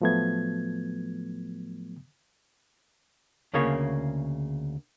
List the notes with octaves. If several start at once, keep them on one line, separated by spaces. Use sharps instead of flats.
A2 F3 F#3 A3 B3 G#6
D2 C#3 A#3 G#4 C#5